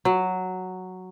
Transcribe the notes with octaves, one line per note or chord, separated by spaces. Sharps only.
F#3